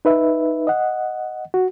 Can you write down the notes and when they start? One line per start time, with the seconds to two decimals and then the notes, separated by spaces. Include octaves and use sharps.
0.05 D#4 B4 E5
0.67 D#5 F#5
1.54 F#4